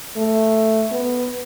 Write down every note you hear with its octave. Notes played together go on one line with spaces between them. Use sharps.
A3
B3